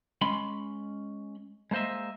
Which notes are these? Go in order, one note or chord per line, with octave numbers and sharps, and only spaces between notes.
G#3 C#4 B5 C6
G#3 A#3 C5 D#5 E5